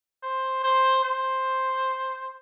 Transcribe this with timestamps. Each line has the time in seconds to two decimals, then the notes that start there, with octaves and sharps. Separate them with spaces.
0.23 C5
0.63 C5
1.03 C5